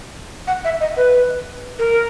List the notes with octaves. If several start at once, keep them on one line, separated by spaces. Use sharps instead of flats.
F#5
E5
D#5
B4
A#4